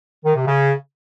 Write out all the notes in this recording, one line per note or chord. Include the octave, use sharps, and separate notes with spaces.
D#3
C3
C#3